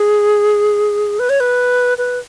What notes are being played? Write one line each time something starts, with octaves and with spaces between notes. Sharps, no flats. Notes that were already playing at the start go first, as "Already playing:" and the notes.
Already playing: G#4
B4
C#5
B4
B4